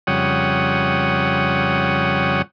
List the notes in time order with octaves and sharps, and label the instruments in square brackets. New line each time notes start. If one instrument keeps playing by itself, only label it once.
[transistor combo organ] F2 C#3 G3 C#5 F#5 D#6